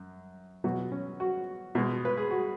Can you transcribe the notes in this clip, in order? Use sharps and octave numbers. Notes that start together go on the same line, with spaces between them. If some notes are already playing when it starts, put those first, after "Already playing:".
Already playing: F#2
B2 F#3 F#4
C#4
F#4
B2 G#3
B4
G#4
F#4